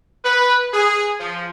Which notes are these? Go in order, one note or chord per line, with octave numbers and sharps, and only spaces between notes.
B4
G#4
F3